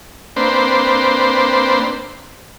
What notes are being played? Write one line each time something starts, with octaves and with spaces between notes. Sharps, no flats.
A#3 C4 D4 B4 C5